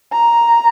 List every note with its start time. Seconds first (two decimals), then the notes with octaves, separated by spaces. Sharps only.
0.12 A#5